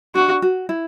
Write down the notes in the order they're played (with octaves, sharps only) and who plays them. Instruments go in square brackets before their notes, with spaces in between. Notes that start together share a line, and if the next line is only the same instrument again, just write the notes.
[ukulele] D4 [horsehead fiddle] F#4
[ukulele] F#4
E4